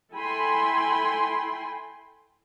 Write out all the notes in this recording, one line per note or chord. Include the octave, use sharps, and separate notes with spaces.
E4 A4 G5 G#5 B5 C6